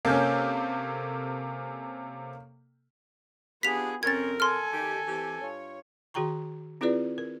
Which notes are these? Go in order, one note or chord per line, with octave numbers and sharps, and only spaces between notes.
C3 A#3 C#4 A4 G6
B3 D4 F4 G4 G#4 B6 F7
F2 C3 C4 C#4 A#4 G#6 A6
A4 G#5 C6 F6
D#3 D#4 G4
E3 C4 G4
G2 F4 C#5
D#3 F#4 G#4 G5 A#5 C#6
C4 E4 F4 G#4 B4 D5
A#4